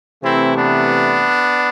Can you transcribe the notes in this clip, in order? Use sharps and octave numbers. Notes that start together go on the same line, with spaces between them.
C3 E3 A3 C4 E4
B3 D4